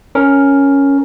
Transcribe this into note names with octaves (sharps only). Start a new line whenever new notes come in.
C#4 A#4